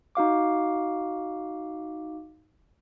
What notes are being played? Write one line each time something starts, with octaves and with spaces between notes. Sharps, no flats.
D#4 F#4 F5 D6